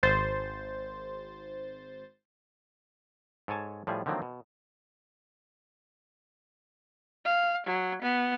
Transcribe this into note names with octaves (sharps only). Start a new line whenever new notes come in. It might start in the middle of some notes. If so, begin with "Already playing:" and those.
G#1 C5 A6
G#2 A4 C#5 G#5 A5
A2 F3 G3 G#4
D3 D#3 F3 F#3 A#3 C4
B2
F5
F#3
B3